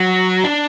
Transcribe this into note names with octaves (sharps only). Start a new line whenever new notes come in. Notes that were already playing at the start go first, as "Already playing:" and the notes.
Already playing: F#3
D4